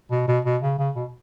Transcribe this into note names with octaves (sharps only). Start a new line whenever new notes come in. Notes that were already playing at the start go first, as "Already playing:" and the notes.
B2
B2
B2
C#3
C#3
B2